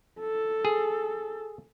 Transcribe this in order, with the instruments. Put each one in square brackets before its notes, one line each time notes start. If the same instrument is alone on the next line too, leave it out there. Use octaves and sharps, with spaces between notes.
[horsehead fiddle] A4
[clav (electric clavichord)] G#4